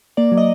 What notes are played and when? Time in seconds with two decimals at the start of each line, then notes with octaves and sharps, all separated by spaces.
0.17 A#3 D5
0.32 F#3
0.37 D#5